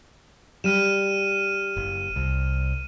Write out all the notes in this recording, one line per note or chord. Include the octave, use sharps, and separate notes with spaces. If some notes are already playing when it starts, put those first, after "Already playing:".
G3 F6 D#7 E7
F#1
C2